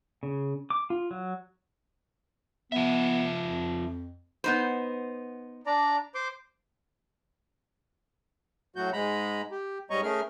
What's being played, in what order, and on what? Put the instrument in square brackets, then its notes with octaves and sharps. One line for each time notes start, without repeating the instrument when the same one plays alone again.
[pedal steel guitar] C#3
D6
F4
F#3
[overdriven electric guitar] F3 E5 [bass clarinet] B3
[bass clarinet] F2
[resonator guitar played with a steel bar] B3 D#4 C5
[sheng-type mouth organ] D4 D5 A#5
C5 C6 D6
[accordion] A2 F#3 F#4 G6
G#2 G#3 A#5 B5
G4
G#2 G3 C#5 D#5 A#5 C#6
A3 C#4 G#4 A#4 F6